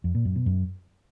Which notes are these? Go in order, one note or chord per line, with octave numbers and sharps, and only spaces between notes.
F2
A#2
F#2
B2
F#2